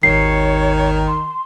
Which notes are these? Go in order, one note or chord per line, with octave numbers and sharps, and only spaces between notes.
G#1 D#2 D#3 C#5 C7
C6